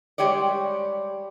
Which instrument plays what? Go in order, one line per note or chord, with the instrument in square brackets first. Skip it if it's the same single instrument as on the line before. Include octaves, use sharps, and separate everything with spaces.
[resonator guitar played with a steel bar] G3 G#3 G4 C#5 D5